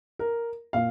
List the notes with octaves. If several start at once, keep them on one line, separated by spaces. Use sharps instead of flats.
A#4
A#2 F5